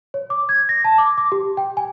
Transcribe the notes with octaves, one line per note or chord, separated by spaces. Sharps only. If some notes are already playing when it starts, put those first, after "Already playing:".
C#5
D6
G#6
A#6
A5
D6
D6
G4
G5
G#5